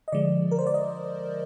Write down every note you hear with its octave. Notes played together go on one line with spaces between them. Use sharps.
D#5
D3 F3 G#3 D5
A#4
C5
D5
D#5